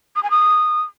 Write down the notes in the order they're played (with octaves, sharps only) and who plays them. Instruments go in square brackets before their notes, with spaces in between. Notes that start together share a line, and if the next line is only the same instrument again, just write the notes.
[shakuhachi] D#6
G#5
D#6